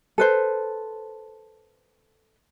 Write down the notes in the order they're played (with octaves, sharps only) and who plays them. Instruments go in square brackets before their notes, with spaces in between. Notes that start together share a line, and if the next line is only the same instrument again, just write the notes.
[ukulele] A4 B4 C5